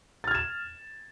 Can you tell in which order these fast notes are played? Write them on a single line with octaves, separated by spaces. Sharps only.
A6 F6 G#6 E7